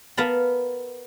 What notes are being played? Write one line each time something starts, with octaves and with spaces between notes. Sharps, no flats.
B3 A#4 F5 A5 B5